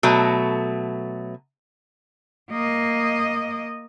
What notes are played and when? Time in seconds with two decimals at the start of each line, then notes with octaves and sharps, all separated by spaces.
0.03 B2 F#3 A3
2.50 A#3 D#5